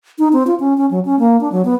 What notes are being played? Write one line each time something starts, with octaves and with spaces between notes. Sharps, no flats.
D#4
C4
F4
C#4
C#4
F#3
C#4
A#3
D4
F#3
B3